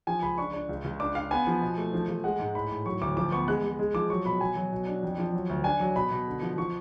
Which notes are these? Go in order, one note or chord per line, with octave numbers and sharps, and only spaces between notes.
F3 G#5
C#2 B5
D4 C#6
D4
C#2
C#2
D4 D6
D4 F5
B3 G#5
F3
B2
A3
F3
F3
G#3 F#5
G#2
A2 B5
A2
F#3 C#6
D2 D6
F3 D6
B3 C#6
G#3 F#6
G#3
G#3
F3 D6
F#3 C#6
B2 B5
B2 G#5
F#3
B2
D4
F2
F3
F#3
D2
D4 G#5
F#3
B2 B5
B2
D3
F3
F3 C#6